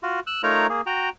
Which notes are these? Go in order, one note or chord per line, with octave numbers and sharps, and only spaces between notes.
F4 F#4
E6 F#6
A3 D#4 F4 A#4 C#5 A#5
A#3 G#4
F#4 G5 A#5